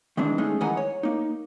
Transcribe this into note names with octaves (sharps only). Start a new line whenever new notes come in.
D#3 E3 G#3 C4 D4
G#3 A3 C#4 D#4
D#3 E3 G#3 F#5 G#5 A#5
C#5
A#3 D#4